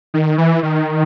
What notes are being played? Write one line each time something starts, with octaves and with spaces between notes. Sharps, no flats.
D#3
E3
D#3